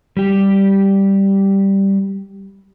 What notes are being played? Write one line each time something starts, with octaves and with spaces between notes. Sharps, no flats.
G3 G4